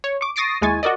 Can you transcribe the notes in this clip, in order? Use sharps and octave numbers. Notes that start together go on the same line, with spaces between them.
C#5
C#6 D6
C#6 D#6 A6 A#6 C7 D7
D#2 G#3 E4 G#5 C#6 A6
F#4 A#4 D5 D#5